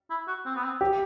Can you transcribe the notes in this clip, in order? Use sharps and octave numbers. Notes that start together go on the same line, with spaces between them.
E4
F#4
C4
B3
C4
G4